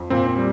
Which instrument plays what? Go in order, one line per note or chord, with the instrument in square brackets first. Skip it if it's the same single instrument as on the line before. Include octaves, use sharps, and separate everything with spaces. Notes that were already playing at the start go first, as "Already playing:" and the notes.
Already playing: [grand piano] F2
[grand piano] A#2 [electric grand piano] C4
[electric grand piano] C4
[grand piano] G3